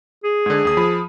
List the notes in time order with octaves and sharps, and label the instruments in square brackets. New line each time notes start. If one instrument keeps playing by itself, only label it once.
[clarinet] G#4
[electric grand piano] G#2 D3
D#2 D#6
F3 B5